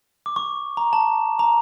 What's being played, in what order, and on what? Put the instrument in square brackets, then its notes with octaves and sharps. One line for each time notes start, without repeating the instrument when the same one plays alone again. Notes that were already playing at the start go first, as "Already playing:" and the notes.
[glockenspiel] D6
C#6
A#5
A5
A#5